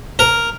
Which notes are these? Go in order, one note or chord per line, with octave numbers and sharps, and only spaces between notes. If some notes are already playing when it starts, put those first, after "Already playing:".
A#4